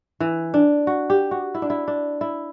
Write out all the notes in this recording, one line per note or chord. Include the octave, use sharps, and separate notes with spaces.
E3
D4
F#4
G4
F#4
E4
D4
E4
D4
E4